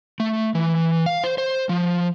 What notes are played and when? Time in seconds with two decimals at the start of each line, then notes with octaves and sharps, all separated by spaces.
0.20 A3
0.55 E3
1.06 F5
1.24 C5
1.38 C5
1.69 F3